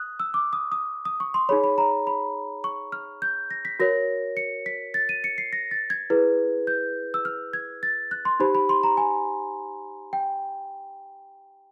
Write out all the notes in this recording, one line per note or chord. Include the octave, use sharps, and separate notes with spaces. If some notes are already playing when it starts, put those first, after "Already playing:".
Already playing: D#6 F#6
E6
D6
D#6
D#6
D#6
C#6
C6
D#4 G#4 C#5 B5
B5
A#5
B5
C#6
F6
G6
A#6
B6
F#4 A#4 C#5 A#6
C#7
B6
A6
D#7
C#7
C7
A#6
A6
G#6
E4 G#4 B4
G6
E6
F6
G#6
A6
F#6
C6
D#4 G4 C5 B5
B5
C6
A#5
G#5
G5